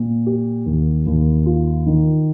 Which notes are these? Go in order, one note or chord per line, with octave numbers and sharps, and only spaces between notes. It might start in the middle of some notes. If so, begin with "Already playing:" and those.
Already playing: A#2
G4
D#2
D#2
F4
D#3